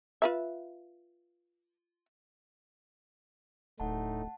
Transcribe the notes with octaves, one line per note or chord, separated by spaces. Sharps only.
F4 B4 E5
D1 A2 A3 D#4 F#5 A5